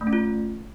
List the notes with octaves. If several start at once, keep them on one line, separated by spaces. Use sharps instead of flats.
A3
C#4
F4